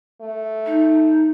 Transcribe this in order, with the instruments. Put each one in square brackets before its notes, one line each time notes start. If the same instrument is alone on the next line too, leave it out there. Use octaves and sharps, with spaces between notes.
[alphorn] A3
[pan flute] D#4